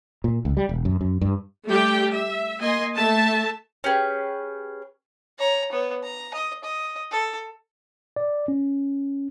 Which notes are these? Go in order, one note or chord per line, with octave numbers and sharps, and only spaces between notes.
A#2
C#2
G3
E1
F#2
F#2
G2
G3 A3 G4 G5
E5
A#3 D#5 G#5 C6
A3 E5 A5
C#4 G4 G#4 B4
C#5 A#5
B3 C#5
A#5
D#5
D#5
A4
D5
C#4